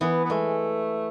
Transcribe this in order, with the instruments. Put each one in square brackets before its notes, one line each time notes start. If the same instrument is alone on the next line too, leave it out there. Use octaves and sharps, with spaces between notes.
[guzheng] E3 [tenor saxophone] B3
[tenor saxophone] B3
[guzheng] G#3 [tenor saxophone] A3